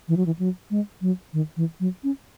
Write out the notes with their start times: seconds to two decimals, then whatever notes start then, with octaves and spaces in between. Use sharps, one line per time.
0.08 E3
0.17 F#3
0.26 E3
0.39 F#3
0.71 G#3
1.01 F#3
1.33 D#3
1.57 E3
1.80 F#3
2.04 C#4